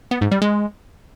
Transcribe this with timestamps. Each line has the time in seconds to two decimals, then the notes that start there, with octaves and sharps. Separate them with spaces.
0.11 B3
0.21 G#2
0.32 G3
0.42 G#3